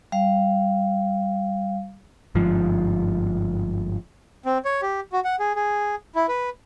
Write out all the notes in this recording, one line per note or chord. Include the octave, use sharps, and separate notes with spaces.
G3 F5
G1 G#2 F3
C4
C#5
G4
F#4
F#5
G#4
G#4
E4
B4